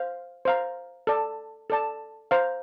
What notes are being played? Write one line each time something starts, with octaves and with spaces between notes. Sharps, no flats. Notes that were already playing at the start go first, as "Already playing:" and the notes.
Already playing: C5 F5
C5 F5 A#5
A4 D5 A5
A4 D5 A5
C5 F5 A#5